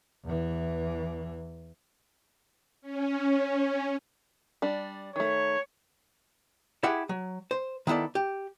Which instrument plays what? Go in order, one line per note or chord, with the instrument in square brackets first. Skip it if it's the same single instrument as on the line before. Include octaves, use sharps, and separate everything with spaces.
[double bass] E2 E3
[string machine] C#4
[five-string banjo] G3 D4
[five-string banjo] D#3 A3 [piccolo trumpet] C#5
[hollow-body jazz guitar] E4 G4 G#4 E5 F#5
F#3
C5
D#3 B3 E4 A4 D5
G4